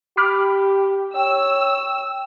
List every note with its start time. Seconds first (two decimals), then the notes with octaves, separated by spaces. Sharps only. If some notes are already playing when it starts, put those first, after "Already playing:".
0.17 G4 B5 D6 F6
1.15 C#5 G5 E6